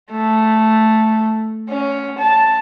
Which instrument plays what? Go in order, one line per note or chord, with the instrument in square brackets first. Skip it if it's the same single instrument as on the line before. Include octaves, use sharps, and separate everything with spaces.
[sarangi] A3
C#4
A5